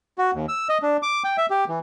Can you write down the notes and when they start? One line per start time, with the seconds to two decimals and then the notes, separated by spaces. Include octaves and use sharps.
0.18 F#4
0.34 D#2
0.49 E6
0.69 D#5
0.82 D4
1.03 D6
1.24 G5
1.38 E5
1.50 G4
1.68 E3